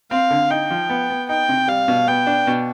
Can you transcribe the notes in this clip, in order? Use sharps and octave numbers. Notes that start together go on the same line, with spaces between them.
C4 F5
D3
D#4 G5
F3
B3
B3
D#4 G5
C3
G3 F5
B2
B3 G5
D4
B2